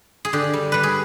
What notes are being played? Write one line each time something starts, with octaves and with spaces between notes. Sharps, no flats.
G#4
D3 G4
G3
G3 B4
G#4